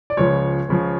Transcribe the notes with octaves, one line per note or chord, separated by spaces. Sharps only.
D5
C#2 C#3 F3 C#5
C#2 C#3 F3